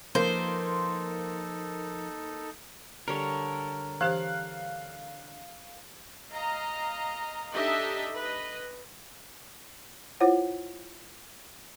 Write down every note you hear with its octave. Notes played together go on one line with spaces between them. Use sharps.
F3 A#3 D#4 A4 B4 C5
D3 G3 A#4 C#5
E3 G4 C5 F5 F#6
D#5 F5 A#5
D4 D#4 G4 A4 D#5 E5
B4 D#5
E4 F4 C5 C#5 F#5